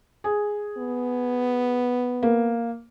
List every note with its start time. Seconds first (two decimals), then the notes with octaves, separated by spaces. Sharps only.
0.24 G#4
0.78 B3
2.23 A#3